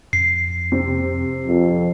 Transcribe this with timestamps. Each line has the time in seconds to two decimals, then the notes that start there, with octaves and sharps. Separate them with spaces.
0.13 F2 C7
0.72 C3 C4
1.46 F2